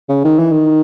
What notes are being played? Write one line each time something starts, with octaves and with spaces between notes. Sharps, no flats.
C#3
D#3
E3
D#3